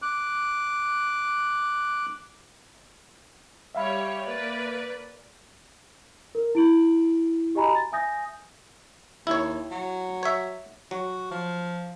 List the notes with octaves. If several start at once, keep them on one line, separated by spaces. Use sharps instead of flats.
D6 F#6
G3 G4 C#5 E5 F5 B5
A#3 B4 D5
A#4
E4 D7 F#7
F#4 G4 D#5 G#5 A#5 B5
A6
E5 G#5 D#6 G6 A#6
D#2 E4 C#5
F#3
C#5 E5
F#3 F#4
F3